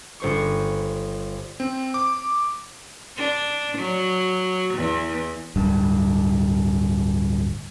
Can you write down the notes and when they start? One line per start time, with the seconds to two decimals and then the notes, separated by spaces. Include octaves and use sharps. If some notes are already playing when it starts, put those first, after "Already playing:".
0.20 G1 C5 C#6
1.60 C4
1.94 D6
3.17 D4
3.78 F#3
4.74 E2
5.56 D1 G2